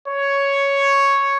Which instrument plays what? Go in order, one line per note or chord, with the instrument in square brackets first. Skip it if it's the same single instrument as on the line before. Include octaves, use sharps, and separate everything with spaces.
[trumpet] C#5